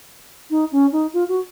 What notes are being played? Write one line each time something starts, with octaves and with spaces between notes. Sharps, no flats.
D#4
C#4
D#4
F4
F#4